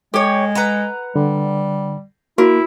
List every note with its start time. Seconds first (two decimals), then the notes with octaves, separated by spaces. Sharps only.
0.14 G#3 G4 A4 C#5
0.55 B4 F#5 A#5
1.16 D3 G3
2.38 A#3 E4 F#4 A#4